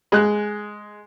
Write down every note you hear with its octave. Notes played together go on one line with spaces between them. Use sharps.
G#3 F#6